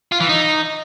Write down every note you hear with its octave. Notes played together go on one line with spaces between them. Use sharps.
F4
E3
D#4